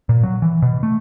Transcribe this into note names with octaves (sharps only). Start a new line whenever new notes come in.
A#2
F#3
E3
B2
A3